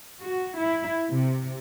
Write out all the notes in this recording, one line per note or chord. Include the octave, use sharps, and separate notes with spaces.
F#4
E4
C3